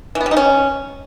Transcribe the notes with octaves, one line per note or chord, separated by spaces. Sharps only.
E3
B3
G3
D#4
C#4